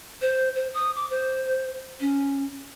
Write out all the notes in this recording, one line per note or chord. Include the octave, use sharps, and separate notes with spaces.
C5
C5
D#6
D6
C5
C#4